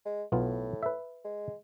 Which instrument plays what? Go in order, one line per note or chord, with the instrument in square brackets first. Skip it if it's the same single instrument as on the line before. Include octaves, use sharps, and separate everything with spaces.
[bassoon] G#3
[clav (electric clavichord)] B1 B3 F4 [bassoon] A2
[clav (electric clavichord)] B4 E5
[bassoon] G#3